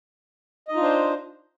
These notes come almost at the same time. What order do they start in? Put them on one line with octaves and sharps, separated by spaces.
D#5 D#4 F4 D4 C5